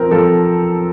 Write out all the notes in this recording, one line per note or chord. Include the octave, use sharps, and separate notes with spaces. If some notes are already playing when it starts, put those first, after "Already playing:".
Already playing: F3 C4 A#4
F3 A4